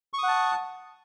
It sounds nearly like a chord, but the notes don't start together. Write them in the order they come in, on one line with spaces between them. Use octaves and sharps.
C#6 D#6 F#5 A5